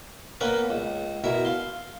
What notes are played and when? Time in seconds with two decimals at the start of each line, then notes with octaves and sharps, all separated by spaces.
0.41 A#3 B3 C#4 A#4 B4
0.70 C#2
1.24 B2 E4 A#4
1.45 F5 C6